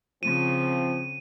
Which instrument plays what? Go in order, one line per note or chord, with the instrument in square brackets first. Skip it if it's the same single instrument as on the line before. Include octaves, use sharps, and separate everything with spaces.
[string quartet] C#3 [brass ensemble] F3 C4 [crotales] D#7